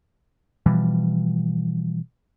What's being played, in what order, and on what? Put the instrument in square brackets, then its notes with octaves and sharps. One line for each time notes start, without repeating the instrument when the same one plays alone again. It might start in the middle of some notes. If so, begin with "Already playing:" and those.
[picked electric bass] B2 E3 F3 G3